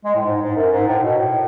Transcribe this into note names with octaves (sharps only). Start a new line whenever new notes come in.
G#3
A2
G#2
G#2
F#2
G#2
A2
B2
A2